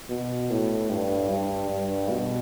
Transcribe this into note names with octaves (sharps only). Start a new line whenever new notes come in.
B2
A2
G2
G2
G2
B2